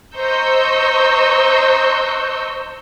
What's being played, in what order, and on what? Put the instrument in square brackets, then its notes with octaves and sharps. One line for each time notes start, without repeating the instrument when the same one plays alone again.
[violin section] C5 D#5 A#5 C#6 E6 G6